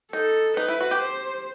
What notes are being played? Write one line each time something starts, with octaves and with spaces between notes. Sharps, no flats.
D#4 A4
D#4 B4
E4
F#4
G4
C5